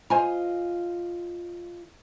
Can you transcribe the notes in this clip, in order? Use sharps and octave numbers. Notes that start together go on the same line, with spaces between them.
F4 C5 D#5 G#5 A#5